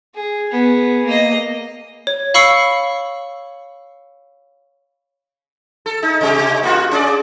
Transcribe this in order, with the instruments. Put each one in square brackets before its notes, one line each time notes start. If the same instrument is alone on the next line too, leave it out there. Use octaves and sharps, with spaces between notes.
[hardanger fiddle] G#4
B3 G#4
A#3 D#5
[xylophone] C#5
F5 B5 C#6 E6 C7 C#7
[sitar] A4
D#4
C3 G#3 G4
A#3 F4 F#4
C#4 G#4 D5